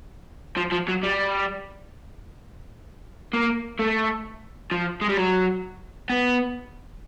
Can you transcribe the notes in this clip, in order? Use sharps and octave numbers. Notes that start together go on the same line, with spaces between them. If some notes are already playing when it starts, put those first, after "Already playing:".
F3
F3
F#3
G3
A#3
A3
F3
G#3
G3
F#3
B3